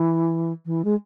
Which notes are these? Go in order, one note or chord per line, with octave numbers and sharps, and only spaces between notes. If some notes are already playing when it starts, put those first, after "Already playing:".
Already playing: E3
E3
G#3